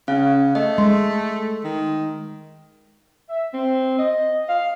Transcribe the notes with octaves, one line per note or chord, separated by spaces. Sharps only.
C#3 C#4 F5
A3 D#5
G#3 C6
D#3
E5
C4
D#5
F5